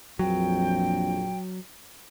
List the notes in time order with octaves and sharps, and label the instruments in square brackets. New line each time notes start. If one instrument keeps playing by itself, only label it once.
[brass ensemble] A#1 F2 [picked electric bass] F#3 [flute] G5